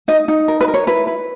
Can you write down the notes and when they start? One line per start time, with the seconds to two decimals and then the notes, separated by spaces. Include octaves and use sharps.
0.08 D#4 D#5
0.28 D#4
0.48 A#4
0.61 B4
0.68 A#4
0.74 C#5
0.87 E4 B4
1.07 B4